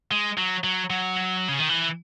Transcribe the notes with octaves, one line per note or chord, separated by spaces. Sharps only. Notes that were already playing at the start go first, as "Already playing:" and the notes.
G#3
F#3
F#3
F#3
C#3
D#3
E3